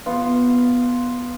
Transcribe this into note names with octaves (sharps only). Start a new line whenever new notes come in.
B3 F4